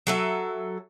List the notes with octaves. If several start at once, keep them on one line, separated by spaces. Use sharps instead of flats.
F#3 A4 E5